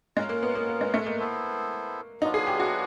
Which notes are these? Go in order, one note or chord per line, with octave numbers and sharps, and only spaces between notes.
G#3 C#4 F4 A#4
A#3
B3
A#3
A#3
G#3
A3
A#3
B3 E4 A4 C5
F#3 B3 D4 D#4 F4
G#4
G4
F#4